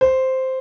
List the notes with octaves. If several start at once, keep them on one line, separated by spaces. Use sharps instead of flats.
C5